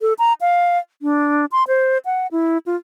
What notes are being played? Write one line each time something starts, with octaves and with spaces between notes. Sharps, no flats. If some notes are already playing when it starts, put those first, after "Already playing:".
A4
A#5
F5
D4
C6
C5
F#5
E4
F4